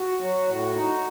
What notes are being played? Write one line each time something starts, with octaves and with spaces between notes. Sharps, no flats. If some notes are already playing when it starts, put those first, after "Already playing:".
Already playing: F#4
F#3
A2
D#4